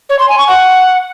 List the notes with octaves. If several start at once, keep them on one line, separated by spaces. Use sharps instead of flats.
C#5
C6
G#5
C#6
F#5